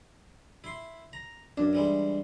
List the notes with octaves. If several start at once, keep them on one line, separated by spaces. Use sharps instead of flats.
E4 C6
A#5
F#2 D4
E3 G3 G#3